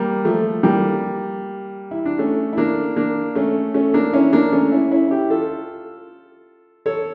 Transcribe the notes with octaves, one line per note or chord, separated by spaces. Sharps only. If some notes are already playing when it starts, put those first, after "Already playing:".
Already playing: G3 A#3
F3 A3
G3 A#3
E4
D4
A3 C#4
E4
A#3 D4
A#3 D4
A3 C#4
A3 C#4
A#3 D4
C#4 E4
A#3 D4
A3 C#4
C#4 E4
C#4 E4
E4 G4
F4 A4
A4 C#5